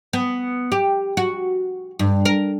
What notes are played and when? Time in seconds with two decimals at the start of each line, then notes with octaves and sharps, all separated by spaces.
0.13 B3
0.72 G4
1.17 F#4
1.99 G2
2.25 A#4